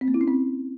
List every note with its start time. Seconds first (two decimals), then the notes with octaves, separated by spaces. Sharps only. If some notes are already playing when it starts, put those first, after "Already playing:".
0.01 C4
0.08 A#3
0.14 E4
0.21 C#4
0.27 C4